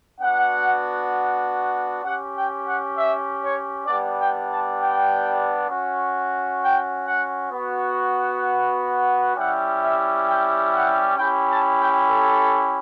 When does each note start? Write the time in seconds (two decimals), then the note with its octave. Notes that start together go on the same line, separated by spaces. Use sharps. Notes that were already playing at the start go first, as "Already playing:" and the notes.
0.21 B3 D4 F#4 F#5
2.03 C#4 G4 F#5
2.34 G5
2.65 F#5
2.95 E5
3.41 C#5
3.86 G3 B3 D4 D5
4.17 G5
4.48 A5
4.77 G5
5.69 C#4 F#4
6.61 G5
7.06 F#5
7.51 B3 F#4
9.35 G3 C#4 E4 G4 F#5
9.80 E5
10.27 G5
10.71 F#5
11.17 C#4 E4 G4 G5
11.48 A5
11.78 G5
12.09 A4